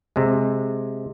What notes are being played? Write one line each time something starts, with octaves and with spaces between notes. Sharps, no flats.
C3 G#3